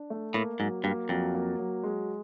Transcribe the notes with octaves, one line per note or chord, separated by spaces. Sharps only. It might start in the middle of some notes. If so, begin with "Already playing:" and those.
Already playing: D4
A3
A2 A#3
G#2 F#3
G2 A#3
F2 F#3
A#3
F#3
G#3